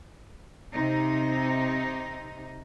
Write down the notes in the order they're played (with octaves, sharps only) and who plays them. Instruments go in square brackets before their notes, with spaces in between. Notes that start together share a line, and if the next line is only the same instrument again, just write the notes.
[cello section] C3 D#4